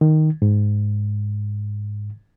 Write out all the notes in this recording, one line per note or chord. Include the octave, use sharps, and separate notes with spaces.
D#3
G#2